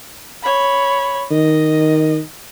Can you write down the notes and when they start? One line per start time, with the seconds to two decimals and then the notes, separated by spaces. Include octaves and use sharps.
0.43 C#5 B5
1.31 D#3 D#5